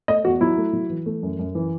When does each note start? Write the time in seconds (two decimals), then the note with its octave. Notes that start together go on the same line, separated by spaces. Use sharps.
0.08 A3 D#5
0.25 E2 F#4
0.41 F#3 E4
0.58 A3
0.73 F#3
0.90 E3
1.06 A3
1.23 F#2
1.39 F#2
1.55 E3